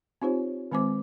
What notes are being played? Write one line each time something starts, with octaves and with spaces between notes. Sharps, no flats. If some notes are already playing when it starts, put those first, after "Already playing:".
C4 D#4 F4 G4 C5 C#5
D#3 G#3 C4 C5 D6